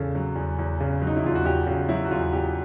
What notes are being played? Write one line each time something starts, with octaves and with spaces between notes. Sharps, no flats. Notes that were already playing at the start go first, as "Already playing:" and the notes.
Already playing: E2 C#3 A4
F#3
E2
E2
C#3
F#3
D#4
E4
E2 F4
F#4
E2 G4
C#3 F#4
F#3 E4
F#4
E2 F4
E2 G4